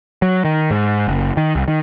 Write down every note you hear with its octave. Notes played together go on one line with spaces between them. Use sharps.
F#3
D#3
G#2
F#1
D#3
C2
D#3